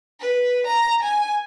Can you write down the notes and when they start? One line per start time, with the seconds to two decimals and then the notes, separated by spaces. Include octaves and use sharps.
0.20 B4
0.66 A#5
1.02 G#5